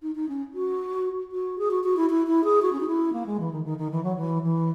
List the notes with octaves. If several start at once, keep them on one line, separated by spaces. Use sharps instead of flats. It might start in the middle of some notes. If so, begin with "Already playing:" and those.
D#4
D#4
C#4
F#4
F#4
G#4
F#4
F#4
E4
E4
E4
G#4
F#4
C#4
D#4
E4
A#3
G#3
E3
D#3
D#3
D#3
E3
F#3
E3
E3